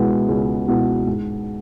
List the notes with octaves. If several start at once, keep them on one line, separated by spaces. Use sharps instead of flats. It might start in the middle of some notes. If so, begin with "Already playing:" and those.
Already playing: C#2 B2 G#3 B3 E4
C#2
B2 G#3 B3 E4
G#2